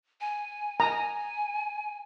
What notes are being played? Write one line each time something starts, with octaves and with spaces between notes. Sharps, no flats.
G#5
G#5 A#5